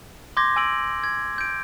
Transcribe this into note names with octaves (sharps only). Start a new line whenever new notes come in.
C6 D6 G6 G#6 A#6
G#5 E6 D7 F#7
G#6
G6 D7